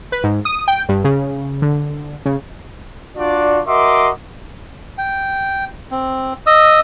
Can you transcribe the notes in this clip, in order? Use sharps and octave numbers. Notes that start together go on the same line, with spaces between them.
B4
G#2
D#6
G5
G2
C#3
D3
C#3
D4 F4 F#4 D5
F#4 A#4 D#5 E5 C6 D6
G5
C4
D#5 D#6 E6